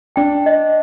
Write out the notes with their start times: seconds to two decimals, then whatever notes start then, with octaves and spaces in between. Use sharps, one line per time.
0.16 D4 G5
0.46 D#5